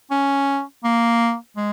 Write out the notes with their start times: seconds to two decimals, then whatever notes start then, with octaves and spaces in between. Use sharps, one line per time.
0.11 C#4
0.84 A#3
1.57 G#3